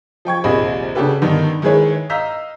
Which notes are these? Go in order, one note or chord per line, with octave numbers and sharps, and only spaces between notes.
F3 G5 C#6 G#6
A#1 D#2 C3 G#4 D#5 B5
C#3 D4 F#4 G4 A4 B4
G2 D3 D#3 B3 D#4
D#3 G#3 E4 G#4 B4 C#5
D#5 F5 A#5 E6 G6 B6